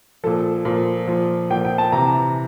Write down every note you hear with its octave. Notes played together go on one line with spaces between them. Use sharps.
A#2 F3 A4
A#2 F3
A#2 F3
A#2 F3 G5
G5
A5
C3 E3 A#5